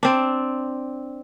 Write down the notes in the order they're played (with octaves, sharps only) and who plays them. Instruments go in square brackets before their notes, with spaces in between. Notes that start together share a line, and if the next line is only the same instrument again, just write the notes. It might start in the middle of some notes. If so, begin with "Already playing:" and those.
[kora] C4 D4